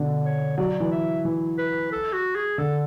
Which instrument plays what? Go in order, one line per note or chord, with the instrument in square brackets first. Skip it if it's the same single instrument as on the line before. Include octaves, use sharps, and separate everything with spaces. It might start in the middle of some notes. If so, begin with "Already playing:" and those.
Already playing: [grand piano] B2 D3
[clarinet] C#5
[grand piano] F#3 [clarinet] D5
[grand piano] E3
[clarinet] E5
[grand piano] E3
[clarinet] B4
A4
F#4
G#4
[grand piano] D3 [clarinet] A4